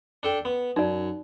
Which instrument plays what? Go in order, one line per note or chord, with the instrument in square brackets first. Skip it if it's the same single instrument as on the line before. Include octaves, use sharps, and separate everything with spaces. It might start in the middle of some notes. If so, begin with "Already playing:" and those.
[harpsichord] D4 A4 G5
B3
[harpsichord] F#2 [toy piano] D#4 D5